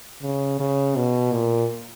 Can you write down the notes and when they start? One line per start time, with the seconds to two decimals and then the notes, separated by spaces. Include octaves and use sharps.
0.22 C#3
0.60 C#3
0.96 B2
1.33 A#2